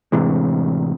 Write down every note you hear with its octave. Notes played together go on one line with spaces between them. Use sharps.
A1 C3 E3 G#3